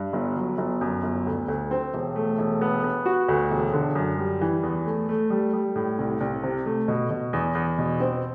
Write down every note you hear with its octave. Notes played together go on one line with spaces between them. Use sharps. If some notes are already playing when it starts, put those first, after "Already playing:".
Already playing: G2
G1
F#3
G1
F#2
G1
D2
D2
C4
E1
A3
E1
B3
B3
F#4
D2
E1
D3
F#2
G3
E3
E2
A3
A3
G3
G3
A2
C2
C2
C3
A3
B2
B2
E2
E2
B2
C4